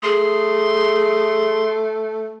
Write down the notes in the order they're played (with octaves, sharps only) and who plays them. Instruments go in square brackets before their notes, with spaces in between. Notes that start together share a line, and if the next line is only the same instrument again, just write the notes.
[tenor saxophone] A3 [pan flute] G#4 [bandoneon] C6